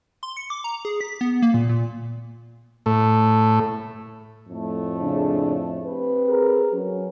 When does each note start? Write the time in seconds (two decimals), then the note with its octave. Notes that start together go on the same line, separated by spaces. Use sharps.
0.23 C6
0.37 C#7
0.50 D6
0.64 A#5
0.85 G#4
1.01 B6
1.21 B3
1.42 A#3
1.54 A#2
1.69 A#2
2.86 A2
4.49 F2 A2 A3
5.01 C#3 D4
5.86 C4 G4 B4
6.28 G#4 A#4
6.72 F#3 C#4